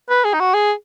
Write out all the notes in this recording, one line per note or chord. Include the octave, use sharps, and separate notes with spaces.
B4
G#4
D#4
F#4
G#4